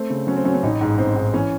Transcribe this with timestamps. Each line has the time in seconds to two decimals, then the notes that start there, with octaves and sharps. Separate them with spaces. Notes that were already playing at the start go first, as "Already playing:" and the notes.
Already playing: A3 C4
0.10 C#3
0.27 F#3 C#4
0.36 C4
0.45 F#3 C#4
0.55 C#4
0.63 A1 D#4
0.81 G#2
0.98 A1 C4
1.16 G#2
1.33 E3 C#4